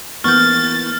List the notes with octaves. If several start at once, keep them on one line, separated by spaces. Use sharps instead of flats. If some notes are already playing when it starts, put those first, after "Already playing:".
E3 A#3 B3 C#6 F6 G6 A6